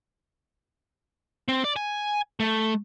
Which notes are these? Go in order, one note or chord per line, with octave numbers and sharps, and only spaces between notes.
C4
D5
G#5
A3